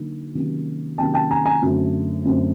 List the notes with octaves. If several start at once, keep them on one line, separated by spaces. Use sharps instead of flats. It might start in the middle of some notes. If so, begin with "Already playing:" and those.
Already playing: D3 F#3 A#3 D#4
C3 D#3 F#3 A#3 C#4
C3 D#3 F#3 A#3 C#4 G5 A5
G5 A5
G#5 A#5
G#5 A#5
F#2 D3 F#3 A3 C4
F#2 D3 F#3 A3 C4